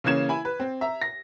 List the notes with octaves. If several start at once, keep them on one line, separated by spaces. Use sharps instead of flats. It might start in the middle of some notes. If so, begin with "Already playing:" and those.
C#3 E3 A#3 C#4 G#6 E7
E4 G#5 B5
B4
C4
E5 A#5
A#6